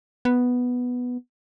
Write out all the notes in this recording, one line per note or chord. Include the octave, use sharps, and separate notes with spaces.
B3